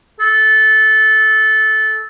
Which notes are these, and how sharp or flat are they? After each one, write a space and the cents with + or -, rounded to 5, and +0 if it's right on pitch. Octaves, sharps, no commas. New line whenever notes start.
A4 -15